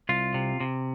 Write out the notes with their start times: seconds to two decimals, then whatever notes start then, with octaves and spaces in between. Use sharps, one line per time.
0.09 C2 F4
0.34 C3
0.60 C3